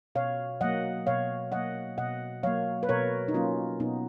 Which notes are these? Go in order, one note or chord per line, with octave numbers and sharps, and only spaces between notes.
B2 C#5 F5
F#3 A#3 D#5 F#5
B2 C#5 F5
F#3 A#3 D#5 F#5
B2 D#5 F#5
F#3 A#3 C#5 F5
B4
B2 A#4 C#5
D#4
F#3 A#3 C#4 F4
B2 B3 D#4